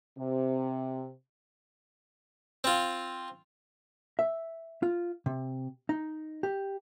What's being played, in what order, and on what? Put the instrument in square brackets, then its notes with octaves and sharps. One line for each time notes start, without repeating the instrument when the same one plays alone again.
[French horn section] C3
[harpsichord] C4 F4
[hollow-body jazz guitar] E5
F4
C3
D#4
G4